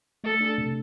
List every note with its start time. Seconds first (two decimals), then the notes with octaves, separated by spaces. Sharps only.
0.24 A3 A4
0.41 D4
0.58 C3